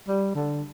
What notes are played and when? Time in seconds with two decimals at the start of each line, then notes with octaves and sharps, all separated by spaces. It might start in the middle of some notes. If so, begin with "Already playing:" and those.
0.08 G3
0.35 D3